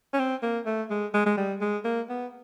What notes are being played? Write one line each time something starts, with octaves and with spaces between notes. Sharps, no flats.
C#4
C4
A#3
A3
G#3
G#3
G#3
G3
G#3
A#3
B3